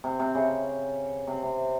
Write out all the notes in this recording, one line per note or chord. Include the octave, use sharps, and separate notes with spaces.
C3
C3
C#3
C3
C3